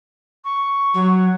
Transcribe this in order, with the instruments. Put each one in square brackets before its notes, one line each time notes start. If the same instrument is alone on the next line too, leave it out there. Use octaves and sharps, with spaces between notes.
[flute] C#6
[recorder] F#3